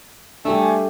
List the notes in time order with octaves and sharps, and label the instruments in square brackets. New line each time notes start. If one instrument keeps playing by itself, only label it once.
[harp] G3 A4 E5 [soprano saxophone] A3 [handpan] D4 G4 [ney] G#5